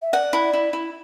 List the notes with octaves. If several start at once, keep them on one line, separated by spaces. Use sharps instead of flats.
E5
D5 F#5
E4
E4
E4